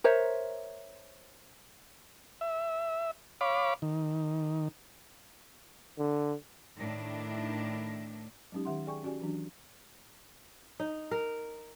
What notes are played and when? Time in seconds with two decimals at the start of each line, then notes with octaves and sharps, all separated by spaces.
0.04 A#4 C5 C#5 E5
2.41 E5
3.41 C#5 F5 B5 D6
3.82 D#3
5.99 D3
6.78 A2 D#3 A3 D4 E4
8.52 F#3 G#3 C#4 D#4 G4
8.65 D#3 G4 E5 F#5 C6
8.87 G#4 D5 G5 G#5 C#6
9.03 C#4 F#4 G4 D5 G#5
9.21 E3 F#3 D4 F#4
10.80 D#4
11.11 A#4